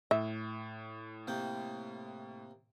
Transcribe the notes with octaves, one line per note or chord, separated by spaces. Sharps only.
A2 E5
C3 A#3 G5